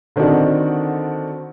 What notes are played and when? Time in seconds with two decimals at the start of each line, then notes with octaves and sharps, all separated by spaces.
0.16 D3 D#3 C4 D4 D#4 F#4